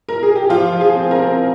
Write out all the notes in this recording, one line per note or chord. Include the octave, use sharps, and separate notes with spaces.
A#4
G#4
G4
F3 F4
F3
G#4
C4
A#4
C4